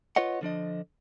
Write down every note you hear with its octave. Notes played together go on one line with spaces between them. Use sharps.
F4 B4 C#5 D#5 F#5
D3 F3 D4 D#5